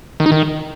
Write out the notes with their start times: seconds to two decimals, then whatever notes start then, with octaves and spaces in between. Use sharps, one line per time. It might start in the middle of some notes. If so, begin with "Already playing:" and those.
0.20 D#3
0.26 D#4
0.32 D#3